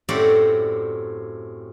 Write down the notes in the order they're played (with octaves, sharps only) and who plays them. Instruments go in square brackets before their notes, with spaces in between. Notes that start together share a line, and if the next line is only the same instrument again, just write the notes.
[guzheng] F#2 A2 C4 F#4 G4 D5